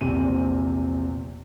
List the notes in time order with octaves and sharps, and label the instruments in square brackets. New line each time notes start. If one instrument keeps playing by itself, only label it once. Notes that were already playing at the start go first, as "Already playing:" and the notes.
[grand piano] A#1 E2 C3 C4 D#7